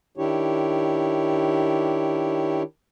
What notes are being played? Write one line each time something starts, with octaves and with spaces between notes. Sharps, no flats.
D#3 D4 E4 G4 C#5